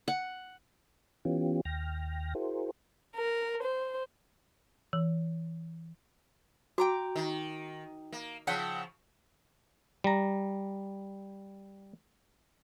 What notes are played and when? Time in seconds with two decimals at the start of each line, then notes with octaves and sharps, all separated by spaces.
0.08 F#5
1.25 E3 B3 C#4 F4 G4
1.65 D#2 G5 F6 A#6
2.35 E4 F#4 G#4 A#4 C5
3.16 A#4
3.64 C5
4.93 E3
6.78 F#4 G5 A#5 D6
7.16 D#3
8.12 A#3
8.47 C#3 F3 E5 F#5 G5
10.04 G3 A#5